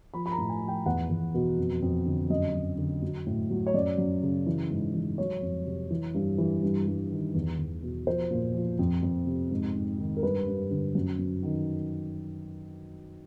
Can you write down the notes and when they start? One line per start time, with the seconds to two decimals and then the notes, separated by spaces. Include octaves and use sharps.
0.14 F3 B5
0.26 B5
0.32 A#5
0.38 A2
0.49 G#5
0.62 F3
0.68 G5
0.86 E2 F#5
1.09 E2
1.34 B2
1.58 F2
1.82 F2
2.06 D3
2.30 F#2 D#5
2.54 F#2
2.78 D3
3.02 F#3
3.26 A2
3.50 F#3
3.67 C#5
3.74 F#2 D5
3.98 F#2
4.23 C#3
4.47 E3
4.70 G#2
4.94 E3
5.18 F#3 C#5
5.42 F2
5.66 C3
5.90 E3
6.15 G2
6.38 E3
6.63 G2
6.87 G2
7.11 D#3
7.35 E2
7.59 E2
7.83 B2
8.07 F3 C5
8.31 A#2
8.54 F3
8.79 F2
9.03 F2
9.27 C3
9.51 G#2
9.75 G#2
9.99 D#3
10.17 A#4
10.23 G2 B4
10.47 G2
10.71 D3
10.95 F#2
11.19 F#2
11.43 D#3